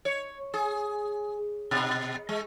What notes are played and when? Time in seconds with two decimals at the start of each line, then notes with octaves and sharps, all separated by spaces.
0.05 C#5
0.54 G#4
1.71 B2
2.29 G#3